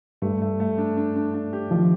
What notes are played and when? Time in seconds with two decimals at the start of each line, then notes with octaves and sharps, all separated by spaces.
0.22 G2 A3
0.42 A3
0.60 A3
0.78 D4
0.97 D4
1.16 D4
1.34 D4
1.53 G4
1.71 D#3 F3